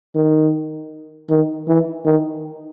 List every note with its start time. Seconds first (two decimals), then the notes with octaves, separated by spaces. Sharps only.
0.16 D#3
1.30 D#3
1.68 E3
2.05 D#3